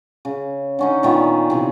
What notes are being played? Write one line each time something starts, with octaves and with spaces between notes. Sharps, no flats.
C#3
D3 C#4 D#4
A#2 D#3 B3
C3 E3